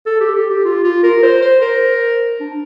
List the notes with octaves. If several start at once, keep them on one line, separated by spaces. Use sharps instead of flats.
A4
G4
G4
G4
F4
F4
A#4
C5
C5
A#4
D4